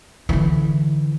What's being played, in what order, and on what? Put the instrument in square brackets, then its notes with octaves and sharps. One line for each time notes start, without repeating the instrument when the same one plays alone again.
[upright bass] D3 E3